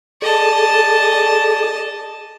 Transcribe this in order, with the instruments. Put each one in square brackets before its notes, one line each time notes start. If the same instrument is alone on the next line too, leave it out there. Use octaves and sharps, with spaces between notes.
[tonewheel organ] G#4 A4 D5 [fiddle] D#5 A5